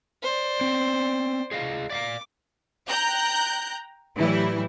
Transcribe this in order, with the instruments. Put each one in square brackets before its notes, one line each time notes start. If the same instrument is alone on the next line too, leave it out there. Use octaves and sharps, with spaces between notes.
[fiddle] C5 D5
[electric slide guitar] C4 C#4
G#4 D#5 F5
[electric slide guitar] D5 E5 F5 [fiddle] D6
[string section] G5 A#5 F#6 G6 A#6
A2 E3 F#3 G3 E4